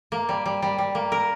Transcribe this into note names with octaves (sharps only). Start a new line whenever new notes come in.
A#3
G3
G3
G3
G3
A#3
A#4